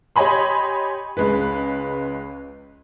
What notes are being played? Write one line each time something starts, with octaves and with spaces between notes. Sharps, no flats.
G4 C#5 D#5 G#5 B5 C6
C#2 G#3 B4